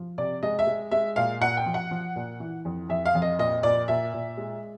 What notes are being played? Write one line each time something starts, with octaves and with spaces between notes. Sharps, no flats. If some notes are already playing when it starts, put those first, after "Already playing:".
Already playing: F3
C3 D5
G#3 D#5
E5
G#3
G#3 E5
A#2 F5
A#2 F#5
G5
F3
F#5
F3
A#2
E3
F2
F2 E5
F5
F2
D#5
A#2 D#5
A#2 D5
A#2 E5
A#2
G#3